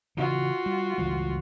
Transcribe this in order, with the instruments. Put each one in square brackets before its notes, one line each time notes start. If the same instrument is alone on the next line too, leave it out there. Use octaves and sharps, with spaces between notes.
[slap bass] C#3 E3 [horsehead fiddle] F4 F#4
[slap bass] G3
C#2 E3 G3